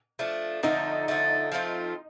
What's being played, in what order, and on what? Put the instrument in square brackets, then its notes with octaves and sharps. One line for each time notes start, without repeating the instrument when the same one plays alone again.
[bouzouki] F3 A3 D4
[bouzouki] D3 F3 A3 [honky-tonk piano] D#4
[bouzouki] D3 F3 A3
F3 A3 C4 F4